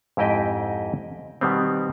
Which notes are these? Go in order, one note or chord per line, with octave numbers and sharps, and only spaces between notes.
F2 G#2 E4 G4 D#5 G5
B2 D#3 G3 B3 C4